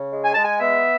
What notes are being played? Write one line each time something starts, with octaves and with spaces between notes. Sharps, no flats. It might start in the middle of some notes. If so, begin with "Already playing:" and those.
Already playing: C#3
G#3
G#5
G#3 A5
G#5
B3 E5